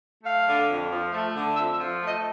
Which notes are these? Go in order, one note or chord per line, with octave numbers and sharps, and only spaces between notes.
A3 F5
D3
F2
F3
A3
D3
F2 E5
E5
F3
A3 D#5